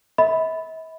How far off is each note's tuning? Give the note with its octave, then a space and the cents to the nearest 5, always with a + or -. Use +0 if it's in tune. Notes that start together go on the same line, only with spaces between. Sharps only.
E5 -45 B5 +10